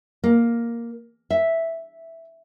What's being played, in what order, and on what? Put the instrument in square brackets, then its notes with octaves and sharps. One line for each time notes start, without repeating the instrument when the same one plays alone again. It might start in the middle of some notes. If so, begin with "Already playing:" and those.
[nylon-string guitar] A#3
E5